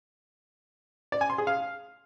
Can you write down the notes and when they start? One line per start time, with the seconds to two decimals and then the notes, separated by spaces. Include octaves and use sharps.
1.12 D5
1.21 G#5
1.30 C6
1.38 G#4
1.47 F5